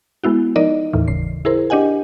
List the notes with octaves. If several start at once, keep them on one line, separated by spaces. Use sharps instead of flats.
G#3 B3 E4 F#4
F3 D#4 A#4 D5 D#5
D#2 A2 E3
G1 C#3 C7
E4 G#4 A#4 C5
D4 G4 D#5 F#5 G#5